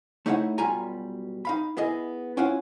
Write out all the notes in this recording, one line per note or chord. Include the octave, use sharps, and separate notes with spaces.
A3 D#4 E4 C#5 F5 F#5
B1 B2 G3 F4 G#5 A#5
D#4 F5 B5
B3 E4 G#4 D#5
C#4 E4 F4 F5 F#5